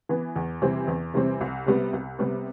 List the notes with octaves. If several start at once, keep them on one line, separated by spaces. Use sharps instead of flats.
E3 B3
E2
C3 E3 G3 C4
E2
C3 E3 G3 C4
C2
C3 G3 B3
C2
C3 G3 B3